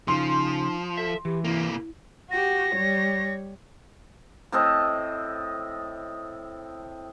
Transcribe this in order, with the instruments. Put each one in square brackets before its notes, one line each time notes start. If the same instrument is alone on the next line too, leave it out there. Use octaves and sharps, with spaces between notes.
[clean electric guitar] C#3 [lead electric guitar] F3 [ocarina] D#4 [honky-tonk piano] C6
[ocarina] A4 [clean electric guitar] E5
[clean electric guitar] E3 [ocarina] G4
[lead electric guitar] C3 A#3 [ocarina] E4
[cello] F#4 G4 [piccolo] A#6
[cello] G3 C#5
[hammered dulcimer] A2 C4 A4 D#5